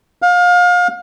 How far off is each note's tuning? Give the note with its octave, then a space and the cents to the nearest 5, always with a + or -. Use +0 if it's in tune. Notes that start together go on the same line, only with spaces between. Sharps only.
F5 +30